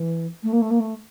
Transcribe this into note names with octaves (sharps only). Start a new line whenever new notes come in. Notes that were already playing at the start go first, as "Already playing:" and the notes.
Already playing: E3
A3
A#3
A3
A#3
A3